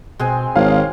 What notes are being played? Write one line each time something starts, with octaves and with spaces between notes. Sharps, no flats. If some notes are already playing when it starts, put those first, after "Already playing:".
B2 G#3 C4 G#5
G#1 C#5 F5